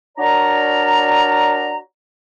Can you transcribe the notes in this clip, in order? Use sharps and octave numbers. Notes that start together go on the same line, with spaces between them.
D4 F#4 A#4 C#5 D5 A#5